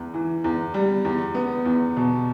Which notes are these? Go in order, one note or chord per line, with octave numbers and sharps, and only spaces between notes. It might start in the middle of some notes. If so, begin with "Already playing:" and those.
Already playing: E2
E3
E2
G3
E2
B3
E2
B2